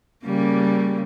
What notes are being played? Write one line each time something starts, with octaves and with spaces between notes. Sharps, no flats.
C#3 G3 A#3